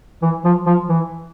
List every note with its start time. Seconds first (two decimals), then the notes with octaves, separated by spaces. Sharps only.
0.22 E3
0.45 F3
0.66 F3
0.89 E3